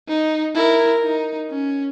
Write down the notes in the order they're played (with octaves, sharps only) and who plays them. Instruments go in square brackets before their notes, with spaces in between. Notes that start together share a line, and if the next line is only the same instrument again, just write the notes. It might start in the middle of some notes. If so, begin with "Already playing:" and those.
[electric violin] D#4
[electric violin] E4 [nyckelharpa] A#4
[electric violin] D#4
C#4